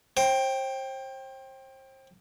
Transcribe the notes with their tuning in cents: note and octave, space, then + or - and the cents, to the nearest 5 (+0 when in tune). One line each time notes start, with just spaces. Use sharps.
C5 +35 G5 +0